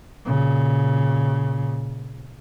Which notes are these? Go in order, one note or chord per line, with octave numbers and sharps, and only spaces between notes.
A#2 C#3